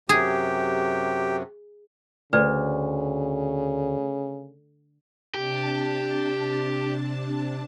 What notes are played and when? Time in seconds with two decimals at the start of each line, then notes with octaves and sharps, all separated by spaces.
0.09 F#2 C3 G4 G#4
2.33 D2 C#3 B4 D5
5.34 C3 D4 G4 A5